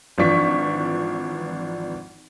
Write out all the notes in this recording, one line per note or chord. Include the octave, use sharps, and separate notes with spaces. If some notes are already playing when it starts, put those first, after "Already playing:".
G#1 E3 F3 D4 C#6 B6